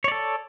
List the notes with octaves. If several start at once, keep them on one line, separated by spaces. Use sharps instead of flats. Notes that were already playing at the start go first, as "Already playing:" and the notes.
A4 C#5 D5